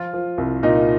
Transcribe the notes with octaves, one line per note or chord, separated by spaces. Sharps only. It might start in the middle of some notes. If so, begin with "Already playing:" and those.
Already playing: F3 F4
F3
C2
A#2 D#4